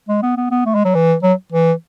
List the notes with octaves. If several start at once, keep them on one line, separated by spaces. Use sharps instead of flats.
G#3
B3
B3
B3
A3
G#3
F#3
E3
F#3
E3